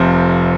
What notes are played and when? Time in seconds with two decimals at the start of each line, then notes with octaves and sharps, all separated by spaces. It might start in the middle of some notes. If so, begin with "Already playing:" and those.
Already playing: F1 F2 C3 C5